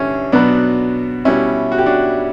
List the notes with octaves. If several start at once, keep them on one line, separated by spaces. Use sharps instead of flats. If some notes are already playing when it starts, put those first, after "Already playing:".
Already playing: G2 D3 C#4 E4
B2 F#3 B3 D4
B2 G3 C#4 E4
F#4
G4
D4 F#4